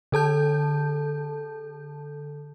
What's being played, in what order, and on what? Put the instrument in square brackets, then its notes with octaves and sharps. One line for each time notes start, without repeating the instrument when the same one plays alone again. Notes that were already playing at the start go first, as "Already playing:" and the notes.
[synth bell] D3 A4 A5 G6